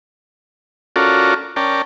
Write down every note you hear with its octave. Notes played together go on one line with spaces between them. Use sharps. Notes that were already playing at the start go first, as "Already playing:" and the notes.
C#4 F4 F#4 A4 A#4 D5
C#4 A#4 D5 G5 A5